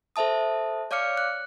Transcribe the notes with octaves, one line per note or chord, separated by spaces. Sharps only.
A4 C5 E5 A5 D#6
C#5 D5 F5 D6 F6 C#7
F#6